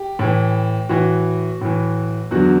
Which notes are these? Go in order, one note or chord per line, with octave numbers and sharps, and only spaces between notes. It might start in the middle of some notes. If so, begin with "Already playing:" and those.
Already playing: G4
A2 E3
A2 E3 F#4
A2 E3
E2 D3 F#3 F#4